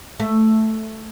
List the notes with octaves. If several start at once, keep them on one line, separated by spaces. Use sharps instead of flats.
A3